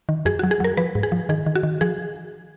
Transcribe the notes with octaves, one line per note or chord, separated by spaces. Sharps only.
D#3
F#2 G#4
F#4
F#3
G#4
F#3 A#4
F3 B4
G#2
G#4
F3
D#3 G#4
D#3
F#4
D#3
F3 G#4